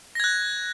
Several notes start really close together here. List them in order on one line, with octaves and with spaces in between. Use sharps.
A#6 G#6 F#6